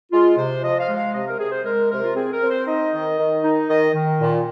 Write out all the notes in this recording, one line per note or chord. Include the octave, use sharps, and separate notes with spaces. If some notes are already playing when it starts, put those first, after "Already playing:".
G#3 F4
C3 C5
F3 D#5
F5
G#3
F5
C3 D#5
A#4
C3 G#4
C5
G#3 A#4
C3 A#4
F4
C4 G#4
A#4
C4
C5
D#4 D#5
D#3
D#3
D#4
D#3 D#5
D#3
A#2